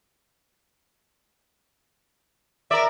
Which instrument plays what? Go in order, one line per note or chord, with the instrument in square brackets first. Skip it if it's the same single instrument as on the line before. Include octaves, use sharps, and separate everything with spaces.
[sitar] A#4 D5 [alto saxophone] E5